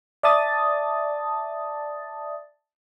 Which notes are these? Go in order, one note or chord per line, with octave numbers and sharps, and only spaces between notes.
D5 E5 A5 D#6 A6